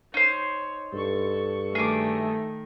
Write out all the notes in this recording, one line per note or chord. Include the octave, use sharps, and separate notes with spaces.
D#4 C5 C#5
G2 A4 C#6
D#3 A3 G#4 D6